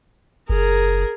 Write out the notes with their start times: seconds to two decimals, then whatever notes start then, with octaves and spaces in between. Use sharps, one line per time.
0.49 F#1 G#4 A#4